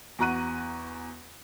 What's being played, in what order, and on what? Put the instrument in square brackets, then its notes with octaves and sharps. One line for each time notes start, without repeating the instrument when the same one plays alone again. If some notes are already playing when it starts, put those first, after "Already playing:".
[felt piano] E2 F#4 A#5 F#6 D#7